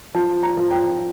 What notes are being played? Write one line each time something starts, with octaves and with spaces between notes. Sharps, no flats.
F3 A5
A#5
F3
G5